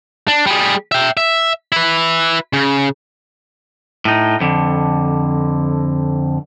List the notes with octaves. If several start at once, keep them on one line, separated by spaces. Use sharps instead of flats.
D4
G3 G#4
E5 G5
E5
E4 B4
C#3
A2 D#4
F2 D3